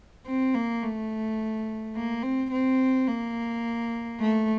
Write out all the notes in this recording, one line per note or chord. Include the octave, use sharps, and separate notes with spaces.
C4
A#3
A3
A#3
C4
C4
A#3
A3